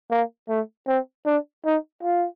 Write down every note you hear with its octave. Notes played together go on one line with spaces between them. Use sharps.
A#3
A3
C4
D4
D#4
F4